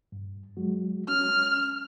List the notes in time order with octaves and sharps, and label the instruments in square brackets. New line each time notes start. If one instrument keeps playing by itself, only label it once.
[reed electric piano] G2
F#3 G#3 F#4
[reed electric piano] C#4 [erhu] F6